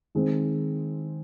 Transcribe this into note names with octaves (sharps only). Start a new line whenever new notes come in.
D#3 G#3 C4